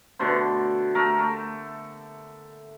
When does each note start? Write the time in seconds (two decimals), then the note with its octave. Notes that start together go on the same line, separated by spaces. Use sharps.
0.19 B2 D3 A3 C5
0.95 A3 A#4
1.19 A3